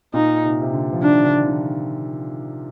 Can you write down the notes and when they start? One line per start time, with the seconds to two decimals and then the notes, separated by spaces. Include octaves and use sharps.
0.14 A#2 D#4
0.44 C3
0.62 C3
0.73 D3
0.93 F3
1.02 D#3 D4
1.25 D3
1.47 D#3